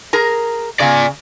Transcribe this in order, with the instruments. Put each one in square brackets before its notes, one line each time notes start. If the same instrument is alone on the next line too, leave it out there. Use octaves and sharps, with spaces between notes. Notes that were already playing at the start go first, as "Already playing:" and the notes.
[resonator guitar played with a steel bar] G#4 A#4 A#5
[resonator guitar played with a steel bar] C#3 [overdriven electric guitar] D5 G#5